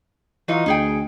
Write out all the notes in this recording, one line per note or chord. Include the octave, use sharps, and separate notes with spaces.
E3 F#3 D#4 F4
D2 D#4 G#4 G5